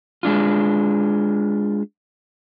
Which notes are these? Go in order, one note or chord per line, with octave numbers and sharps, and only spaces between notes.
G#3 D4 F4